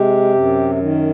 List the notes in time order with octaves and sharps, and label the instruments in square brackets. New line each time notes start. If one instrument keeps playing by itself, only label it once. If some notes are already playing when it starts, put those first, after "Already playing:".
Already playing: [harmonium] C3 G#3 G4
F#2
D#3